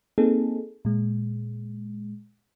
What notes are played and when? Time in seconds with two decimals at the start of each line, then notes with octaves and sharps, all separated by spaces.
0.18 A#3 C4 D#4 G#4 A4
0.85 A#2 G#3